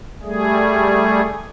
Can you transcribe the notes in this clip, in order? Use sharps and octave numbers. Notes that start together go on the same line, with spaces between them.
G3 A3 G#4